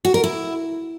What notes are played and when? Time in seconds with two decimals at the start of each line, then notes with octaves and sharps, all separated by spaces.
0.05 F#4
0.14 A#4
0.24 E4